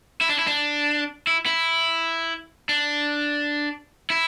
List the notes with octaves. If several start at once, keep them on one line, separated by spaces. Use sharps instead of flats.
E4
D4
E4
D4
E4
E4
D4
E4